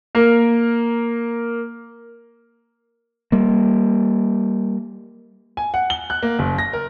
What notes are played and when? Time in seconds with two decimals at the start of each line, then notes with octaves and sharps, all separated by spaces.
0.15 A#3 A#4
3.32 G3 A#3
5.57 G#5
5.74 F#5
5.90 G7
6.10 F#6
6.23 A#3
6.39 F#1
6.58 A#6
6.73 A#4